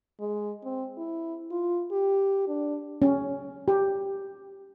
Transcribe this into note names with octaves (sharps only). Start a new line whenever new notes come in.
G#3
C4
E4
F4
G4
D4
C#4
G4